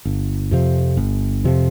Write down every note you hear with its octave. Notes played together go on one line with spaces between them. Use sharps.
G1
F2 C3 F3
G1
F2 C3 F3